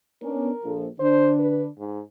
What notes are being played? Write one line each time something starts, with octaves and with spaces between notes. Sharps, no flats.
B3 C#4 D4 A#4
A#1 F3 A4
D3 D4 C5
B4
G#2